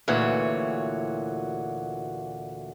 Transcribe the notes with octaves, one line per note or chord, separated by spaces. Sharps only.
D2 A#2 E3 F#4 C#5